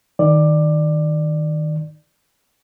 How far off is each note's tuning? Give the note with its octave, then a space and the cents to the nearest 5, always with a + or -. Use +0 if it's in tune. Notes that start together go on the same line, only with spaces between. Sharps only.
D#3 +0 D5 +15